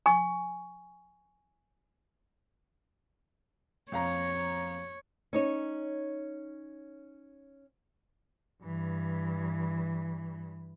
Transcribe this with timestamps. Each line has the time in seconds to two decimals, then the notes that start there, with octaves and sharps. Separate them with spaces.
0.06 G#5 C#6
3.92 F2 C#5 F5 A#5
5.33 C#4 D#4 C#5
8.63 G2 E3